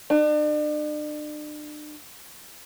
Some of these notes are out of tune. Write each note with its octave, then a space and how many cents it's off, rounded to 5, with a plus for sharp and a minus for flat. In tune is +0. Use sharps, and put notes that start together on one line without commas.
D4 +40